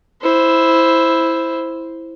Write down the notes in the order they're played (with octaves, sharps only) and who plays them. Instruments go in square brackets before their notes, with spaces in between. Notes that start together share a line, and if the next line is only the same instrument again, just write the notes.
[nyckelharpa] E4 C5